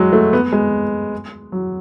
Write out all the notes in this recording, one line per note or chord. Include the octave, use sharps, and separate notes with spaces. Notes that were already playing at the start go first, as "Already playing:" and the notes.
Already playing: F#3 G#3
A3
B3
G#3
F#3